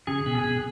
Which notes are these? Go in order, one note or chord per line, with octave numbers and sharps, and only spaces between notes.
C#3 C#4 G#4
B2 B3
G#4
B2 B3